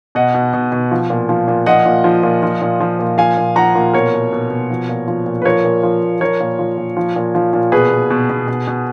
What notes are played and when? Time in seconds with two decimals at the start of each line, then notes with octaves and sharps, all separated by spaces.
0.15 B2 D#5 F#5
0.34 B2
0.54 B2
0.72 B2
0.91 F3
1.10 A#2
1.29 F3
1.48 A#2
1.66 F3 D#5 F#5
1.86 A#2
2.04 F3
2.23 A#2
2.43 F3
2.62 A#2
2.80 F3
2.99 A#2
3.18 F3 F5 G#5
3.37 A#2
3.56 F3 F#5 A#5
3.75 A#2
3.93 B2 A#4 C#5
4.14 B2
4.33 B2
4.50 B2
4.70 F3
4.89 A#2
5.08 F3
5.26 A#2
5.42 B4
5.45 F3 A#4 C#5
5.65 A#2
5.83 F3
6.03 A#2
6.21 F3 A#4 C#5
6.40 A#2
6.59 F3
6.78 A#2
6.97 F3
7.16 A#2
7.35 F3
7.53 A#2
7.72 B2 G#4 B4
7.91 B2
8.11 B2
8.30 B2
8.48 B2
8.67 B2